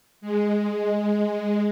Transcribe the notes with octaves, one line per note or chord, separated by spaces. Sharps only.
G#3
G#3